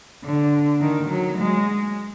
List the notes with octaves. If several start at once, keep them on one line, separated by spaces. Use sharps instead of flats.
D3
D#3
F#3
G#3